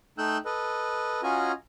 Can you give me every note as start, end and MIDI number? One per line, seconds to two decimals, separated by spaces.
0.18 0.38 57
0.18 0.38 63
0.18 0.38 79
0.18 0.38 88
0.18 0.38 90
0.18 0.38 91
0.45 1.21 69
0.45 1.21 71
0.45 1.21 75
1.23 1.52 61
1.23 1.52 65
1.23 1.52 66
1.23 1.52 75
1.23 1.52 80
1.23 1.52 82